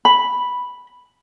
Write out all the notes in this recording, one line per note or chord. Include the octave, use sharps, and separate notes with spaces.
B5